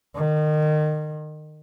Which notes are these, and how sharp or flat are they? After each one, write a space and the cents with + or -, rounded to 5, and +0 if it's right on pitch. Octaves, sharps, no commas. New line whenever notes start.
D#3 -30